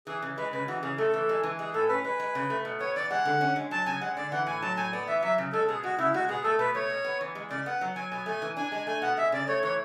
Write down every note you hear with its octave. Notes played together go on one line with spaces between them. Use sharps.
E3 G#4
C#3
G#3 B4
C#3 B4
E3 F#4
C#3 G#4
A3 A4
E3
G#3
E3
G#3 G#4
A2 A4
C#4 B4
G#3 B4
G#3
C#3
A3
B2
B3 C#5
E3 D5
G#3 F#5
D3
C#4
G#3
F#3 A5
C#3 G#5
G#3 F#5
D3 D5
E3 F#5
A2 G#5
F#3 A5
A2 G#5
B3 D5
E3 E5
F#3 E5
C#3
G#3 A4
B2 G#4
G#3 F#4
C#3 E4
G#3 F#4
B2 G#4
A3 A4
B2 B4
A3 C#5
B2
B3
E3
G#3
C#3 D5
B3 F#5
F#3
F#3 G#5
B2 G#5
A3 G#5
E3
D4 G#5
G#3 G#5
A3 G#5
B2 F#5
G#3 E5
C#3 D5
A3 C#5
E3 C#5